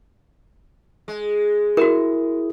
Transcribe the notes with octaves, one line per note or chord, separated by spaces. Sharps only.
G#3
E4 F#4 A#4